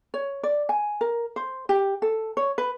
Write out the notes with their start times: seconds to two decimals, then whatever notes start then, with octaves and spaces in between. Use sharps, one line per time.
0.14 C#5
0.43 D5
0.69 G#5
1.01 A#4
1.36 C5
1.69 G4
2.02 A4
2.37 C#5
2.58 B4